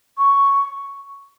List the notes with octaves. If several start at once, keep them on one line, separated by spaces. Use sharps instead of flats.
C#6